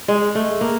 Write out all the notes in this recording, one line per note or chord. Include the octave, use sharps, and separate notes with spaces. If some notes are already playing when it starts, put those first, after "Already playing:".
G#3
A3
A#3